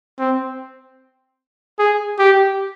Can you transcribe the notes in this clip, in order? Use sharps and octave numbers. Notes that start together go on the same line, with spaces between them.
C4
G#4
G4